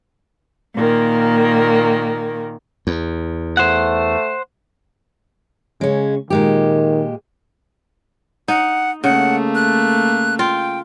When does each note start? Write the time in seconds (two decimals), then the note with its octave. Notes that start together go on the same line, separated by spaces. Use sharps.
0.75 A#2 D#3 A#3
2.87 E2
3.57 A3 C5 F#5
5.81 C#3 G#3 C#4
6.30 A#2 D#3 G#3 G4
8.48 D#4 F#5
9.04 C#3 A3 A#3 F#5
9.55 F#6
10.39 F4 G5